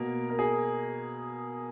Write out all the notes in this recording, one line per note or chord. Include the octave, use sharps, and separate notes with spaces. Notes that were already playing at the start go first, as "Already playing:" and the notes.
Already playing: B2 A#3 A#4
A#4
G#4